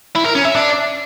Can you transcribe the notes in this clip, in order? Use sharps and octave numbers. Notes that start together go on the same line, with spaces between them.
E4
A#4
C#4
E5
D4